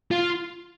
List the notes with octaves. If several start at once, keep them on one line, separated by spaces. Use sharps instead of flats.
F4